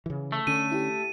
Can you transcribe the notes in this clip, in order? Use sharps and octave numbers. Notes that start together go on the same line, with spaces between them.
C#3 E3
A3
D3 C#4 D#7
E4 G4